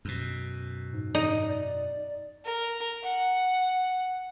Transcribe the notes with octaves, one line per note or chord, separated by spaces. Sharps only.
F#2 B2
G#2
D#4
D5
A#4
F#5